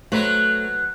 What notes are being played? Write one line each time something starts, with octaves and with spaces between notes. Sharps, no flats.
F#3 A3 B4 C5